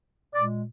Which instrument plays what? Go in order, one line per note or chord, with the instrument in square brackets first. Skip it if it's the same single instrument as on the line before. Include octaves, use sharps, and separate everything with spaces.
[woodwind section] A#2 G#3 D5